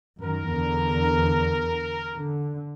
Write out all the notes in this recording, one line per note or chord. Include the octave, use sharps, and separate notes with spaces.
F#2 D#3 A#4
E2 D3
D3